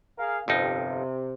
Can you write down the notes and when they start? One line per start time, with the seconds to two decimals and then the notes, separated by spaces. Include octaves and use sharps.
0.18 G#4 A#4 F5
0.48 G1 F2 C3 D#4